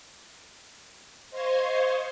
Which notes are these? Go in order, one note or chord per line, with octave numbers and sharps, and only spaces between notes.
C5 D#5 F5 C6 C#6 G#6